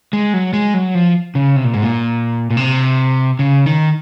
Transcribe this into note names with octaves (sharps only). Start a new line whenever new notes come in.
G#3
F#3
G#3
F#3
F3
C#3
C3
A#2
G#2
A#2
A#2
C3
C#3
D#3